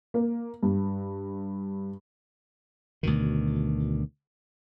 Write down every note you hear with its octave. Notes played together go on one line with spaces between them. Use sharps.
A#3
G2
D2 B2 D#3